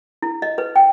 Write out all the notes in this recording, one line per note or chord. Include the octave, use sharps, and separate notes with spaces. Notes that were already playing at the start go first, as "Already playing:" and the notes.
E4
D#5
B4
G5